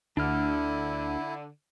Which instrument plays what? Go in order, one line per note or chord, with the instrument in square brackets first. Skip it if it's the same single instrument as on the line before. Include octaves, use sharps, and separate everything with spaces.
[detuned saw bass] D2 [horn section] D3 [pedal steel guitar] D4 F6 [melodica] E4